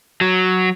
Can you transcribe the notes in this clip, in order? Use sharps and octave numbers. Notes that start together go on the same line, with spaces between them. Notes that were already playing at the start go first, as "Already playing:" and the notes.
F#3